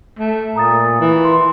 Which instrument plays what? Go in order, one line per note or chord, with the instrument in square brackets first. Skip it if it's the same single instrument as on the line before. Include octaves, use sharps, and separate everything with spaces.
[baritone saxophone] A3
[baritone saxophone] A#2 [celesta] A#5 D#6 A6
[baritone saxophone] E3
[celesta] C6